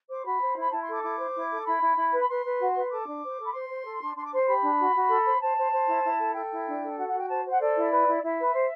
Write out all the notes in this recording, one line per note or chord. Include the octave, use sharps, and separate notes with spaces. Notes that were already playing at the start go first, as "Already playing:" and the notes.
C5 D6
F#4 B5
C5
E4
B5
E4 A5
C6
A4
D6
E4 D6
C5
E4
A4
E4 B5
E4
E4
B4
B5
B4 C6
B4
F#4
B4
A4 D6
D4
C5
A4
B5
C5 C6
C5
A4
D4
D4 C6
D6
C5 C6
G4 B5
D4
F#4
F#4
A4
C5
C5 A5
C5
C5
E4
E4
A4
A4 G5
E4
D4
A4
F#4 F#5
F#5
F#4
G5
C5 A5
C5
F#5
A4 D5
E4
B4
E4
E4 E5
B4
C5